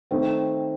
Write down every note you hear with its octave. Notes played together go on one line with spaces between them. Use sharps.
D#3 A3 C4